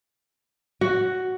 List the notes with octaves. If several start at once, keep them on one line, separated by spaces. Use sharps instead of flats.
F#4